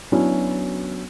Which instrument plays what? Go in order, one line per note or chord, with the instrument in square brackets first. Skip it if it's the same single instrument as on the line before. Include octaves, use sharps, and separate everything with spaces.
[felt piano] F#3 B3 C#4 D4 E4 F#4